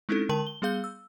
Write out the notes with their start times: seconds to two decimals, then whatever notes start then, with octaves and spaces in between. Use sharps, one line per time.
0.09 G#3 C4 C#4 D#4 E4 A4
0.29 D3 G#3 A#4 A5 F#7
0.47 G7
0.62 G3 B3 G#4 F5 G6 G7
0.84 E6